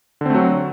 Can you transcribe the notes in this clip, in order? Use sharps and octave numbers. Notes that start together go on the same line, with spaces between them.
D3 F#3 A3 C4